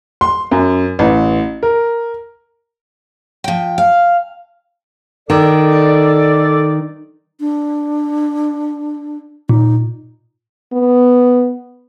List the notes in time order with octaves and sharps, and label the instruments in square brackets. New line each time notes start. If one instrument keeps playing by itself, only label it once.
[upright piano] C6
F#2
A1
A#4
[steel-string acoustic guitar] F3 G5
F5
[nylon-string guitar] D#3 [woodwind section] A4 D5
[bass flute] D4
[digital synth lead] A#2 [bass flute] D#4
[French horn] B3